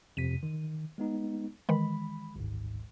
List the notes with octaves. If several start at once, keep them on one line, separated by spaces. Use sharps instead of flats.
F2 C3 B6 D#7
D#3
G#3 B3 D#4
D#3 E3 G#3 B5
G#1 D2 G#2